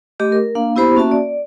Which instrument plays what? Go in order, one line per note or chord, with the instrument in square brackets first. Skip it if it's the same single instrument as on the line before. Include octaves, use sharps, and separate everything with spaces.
[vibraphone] A3 G4 D#5 D6
A#4
A#3 D4 F5
B3 E4 G4 C5 B5
A#3 C#4 F#4 E5 A5
D5